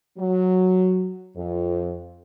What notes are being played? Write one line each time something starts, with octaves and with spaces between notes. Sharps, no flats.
F#3
F2